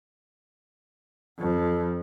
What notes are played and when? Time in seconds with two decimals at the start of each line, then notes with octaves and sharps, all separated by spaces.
1.39 F2